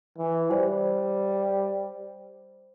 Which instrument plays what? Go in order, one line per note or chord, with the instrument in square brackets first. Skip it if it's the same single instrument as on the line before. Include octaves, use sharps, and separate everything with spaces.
[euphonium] E3
[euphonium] G3 [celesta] C5